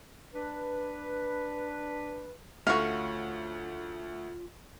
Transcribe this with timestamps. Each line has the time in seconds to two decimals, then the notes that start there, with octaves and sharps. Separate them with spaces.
0.34 D4 B4
2.67 D2 A3 C#4 F4 F#4 F5 C#6